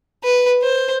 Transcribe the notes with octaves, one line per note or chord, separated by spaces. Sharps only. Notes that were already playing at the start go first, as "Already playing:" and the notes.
B4
C5